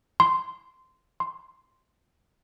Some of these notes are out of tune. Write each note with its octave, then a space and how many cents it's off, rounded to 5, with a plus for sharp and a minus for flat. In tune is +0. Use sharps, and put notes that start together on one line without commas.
C6 -10
C6 +0